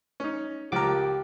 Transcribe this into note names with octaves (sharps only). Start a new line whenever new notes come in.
C#4 D#4
C#2 F3 G4 A#4 D6